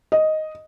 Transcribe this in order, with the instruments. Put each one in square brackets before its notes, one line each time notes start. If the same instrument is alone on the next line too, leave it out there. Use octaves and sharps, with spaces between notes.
[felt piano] D#5